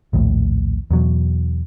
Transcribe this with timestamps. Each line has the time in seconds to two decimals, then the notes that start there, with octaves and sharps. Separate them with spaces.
0.13 A#1 D#2 A2
0.91 E2 B2 F#3